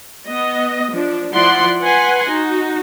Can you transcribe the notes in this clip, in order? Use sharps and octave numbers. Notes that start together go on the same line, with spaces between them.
B3 D#5
F3 D4
F3 E4 D5 F#5 C6
B4 F#5 G#5 C6
D#4 F#4